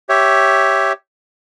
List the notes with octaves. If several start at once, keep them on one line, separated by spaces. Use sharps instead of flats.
G4 C#5 E5